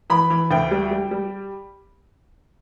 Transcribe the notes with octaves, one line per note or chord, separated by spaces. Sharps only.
E3 B5
E3
D2 G5
G3
G3
G3